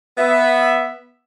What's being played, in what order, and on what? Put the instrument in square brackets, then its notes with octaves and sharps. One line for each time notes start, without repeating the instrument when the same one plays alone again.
[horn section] B3 E5